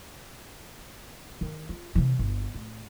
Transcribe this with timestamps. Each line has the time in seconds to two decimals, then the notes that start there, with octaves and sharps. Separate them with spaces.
1.41 D#3
1.69 F4
1.95 C3 E3
2.19 G1
2.55 A2